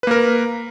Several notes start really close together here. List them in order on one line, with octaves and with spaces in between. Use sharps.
B4 A#3 A#4